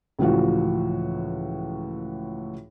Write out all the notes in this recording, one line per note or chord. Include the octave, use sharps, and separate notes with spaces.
C#2 A2 E3 F3 F#4